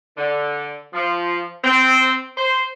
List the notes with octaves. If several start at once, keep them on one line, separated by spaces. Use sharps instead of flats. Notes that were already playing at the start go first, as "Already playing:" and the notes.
D3
F3
C4
C5